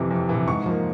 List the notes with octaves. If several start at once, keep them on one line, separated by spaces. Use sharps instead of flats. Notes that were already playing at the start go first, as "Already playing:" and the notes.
Already playing: F2 C3 E3
F2
C3 E3
G#2 C#6
F3 A#3